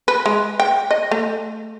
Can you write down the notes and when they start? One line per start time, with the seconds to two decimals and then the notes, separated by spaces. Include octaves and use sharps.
0.08 B4
0.26 G#3
0.60 G5
0.91 D#5
1.11 A3